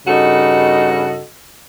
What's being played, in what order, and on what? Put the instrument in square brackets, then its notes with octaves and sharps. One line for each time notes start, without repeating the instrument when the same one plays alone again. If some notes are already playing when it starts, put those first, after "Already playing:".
[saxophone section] G2 C#3 D#4 F#4 A4 D#5